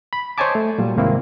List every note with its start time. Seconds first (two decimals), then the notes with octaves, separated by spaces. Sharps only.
0.13 B5
0.38 C5 C#5 D#5 G#5 A5 D6
0.55 A3
0.78 A#2 F#3 G3
0.96 C2 G#2 D#3 A#3 C4 E4